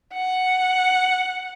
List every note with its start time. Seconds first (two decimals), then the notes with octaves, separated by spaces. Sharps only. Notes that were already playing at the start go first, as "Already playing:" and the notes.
0.14 F#5